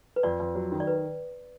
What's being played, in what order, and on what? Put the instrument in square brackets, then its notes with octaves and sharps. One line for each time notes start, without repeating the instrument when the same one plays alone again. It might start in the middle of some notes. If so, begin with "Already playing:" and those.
[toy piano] B4
[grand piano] F2 [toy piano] D5
[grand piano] F2
F#3
D#3
[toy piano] D5
B4